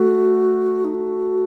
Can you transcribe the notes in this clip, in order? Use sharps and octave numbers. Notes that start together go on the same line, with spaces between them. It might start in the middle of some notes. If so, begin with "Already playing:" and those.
Already playing: A3 F#4
D#4
F#4